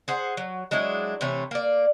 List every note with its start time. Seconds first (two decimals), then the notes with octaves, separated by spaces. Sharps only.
0.08 G#4 C5 F#5
0.37 F#3
0.71 F#3 G#3 D4 E4
1.21 C3 E3 A3 C#5
1.51 A#3 D5